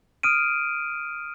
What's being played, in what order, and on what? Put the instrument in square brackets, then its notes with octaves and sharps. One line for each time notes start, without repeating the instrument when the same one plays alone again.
[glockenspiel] D#6 F6 D7 D#7